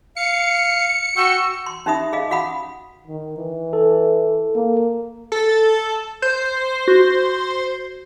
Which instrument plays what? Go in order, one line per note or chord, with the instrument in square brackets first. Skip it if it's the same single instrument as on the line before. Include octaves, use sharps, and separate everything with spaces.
[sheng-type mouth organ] F5 [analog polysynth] C#7
[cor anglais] F#4 [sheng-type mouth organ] G5 [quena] E6
[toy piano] C6
C#4 D#4 G4 E5 B5 D#6
G#4 D#5 F5
F#4 F5 F#5 B5 D#6
[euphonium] D#3
E3
[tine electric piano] A4
[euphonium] A#3
[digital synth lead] A4
[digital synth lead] C5 [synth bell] G6
[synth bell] F#4